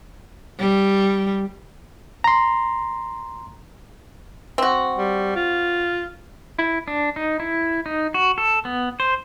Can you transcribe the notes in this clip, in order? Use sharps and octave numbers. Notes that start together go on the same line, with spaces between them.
G3
A#5 C6
C4 F#4
G3
F4
E4
D4
D#4
E4
D#4
F#4
A4
B3
C5